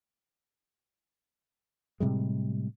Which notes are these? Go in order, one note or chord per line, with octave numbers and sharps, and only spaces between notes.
A2 C3 G3 G#3